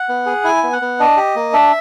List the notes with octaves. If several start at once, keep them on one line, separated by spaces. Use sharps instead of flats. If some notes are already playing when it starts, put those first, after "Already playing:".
Already playing: F#5
B3
G#4
E4 G#5
B3
F#5
B3
D4 D#5
G4
A#3
D4 E5